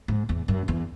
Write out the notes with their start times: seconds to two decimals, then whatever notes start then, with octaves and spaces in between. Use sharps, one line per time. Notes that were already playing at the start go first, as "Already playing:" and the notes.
0.08 G#2
0.29 E2
0.48 F#2
0.68 E2